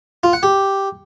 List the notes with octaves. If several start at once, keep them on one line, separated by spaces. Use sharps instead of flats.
F4
F#5
G4